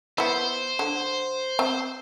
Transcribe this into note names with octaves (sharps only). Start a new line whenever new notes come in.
B3 E4 C5
D3
C4 E5